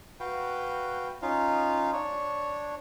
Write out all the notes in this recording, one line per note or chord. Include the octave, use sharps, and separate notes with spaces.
F#4 B4 F5 G5
C#4 D#4 F4 F5
D4 C#5